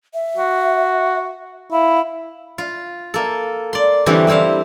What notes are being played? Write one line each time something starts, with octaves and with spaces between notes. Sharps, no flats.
E5
F#4
E4 F5
F4
A#3 A4
D5 C6
D3 E3 G3 C4 C#4 E4
G3 C4 E4 C5 F5